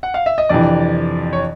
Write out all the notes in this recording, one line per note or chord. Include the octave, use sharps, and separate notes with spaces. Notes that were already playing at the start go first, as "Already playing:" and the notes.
F#5
F5
E5
D#5
F2 C3 E3 D4 D5
C#5